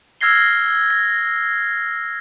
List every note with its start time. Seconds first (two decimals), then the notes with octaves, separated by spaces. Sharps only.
0.21 E6 F6 G#6 A#6 C7 G7
0.90 A#6